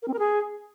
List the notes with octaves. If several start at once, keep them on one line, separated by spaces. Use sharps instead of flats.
A#4
C4
A#4
G#4